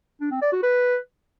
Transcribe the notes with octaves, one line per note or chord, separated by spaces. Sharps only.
D4
C4
D5
F#4
B4